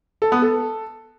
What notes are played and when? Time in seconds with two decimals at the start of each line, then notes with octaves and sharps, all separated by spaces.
0.22 A4
0.32 B3
0.42 A4